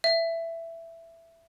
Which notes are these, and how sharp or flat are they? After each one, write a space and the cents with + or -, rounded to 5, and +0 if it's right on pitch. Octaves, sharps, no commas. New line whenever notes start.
E5 +10